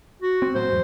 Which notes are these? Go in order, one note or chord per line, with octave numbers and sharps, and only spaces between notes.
F#4
C4
A2 F#3 C5
E2 G#2